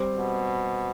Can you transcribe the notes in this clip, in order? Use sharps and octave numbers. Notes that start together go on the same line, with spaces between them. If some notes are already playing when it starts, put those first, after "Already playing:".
Already playing: G3 C4 G4 C5
B2